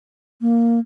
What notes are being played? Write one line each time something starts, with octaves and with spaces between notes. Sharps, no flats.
A#3